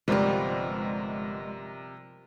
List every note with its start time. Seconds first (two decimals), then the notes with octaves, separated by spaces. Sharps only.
0.08 G1 C3 F3 G3 G#3 A#4 B4 D5